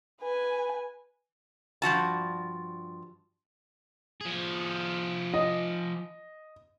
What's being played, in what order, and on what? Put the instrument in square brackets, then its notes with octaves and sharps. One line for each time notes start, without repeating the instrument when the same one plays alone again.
[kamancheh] B4 G#5
[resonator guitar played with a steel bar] G2 F3 F#4 A5
[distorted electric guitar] F3 G#4
[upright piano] D#5